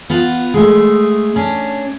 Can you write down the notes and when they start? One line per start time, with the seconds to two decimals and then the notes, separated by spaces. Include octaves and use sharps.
0.10 B3 F4 F#5
0.54 G#3 A3
1.36 C#4 D4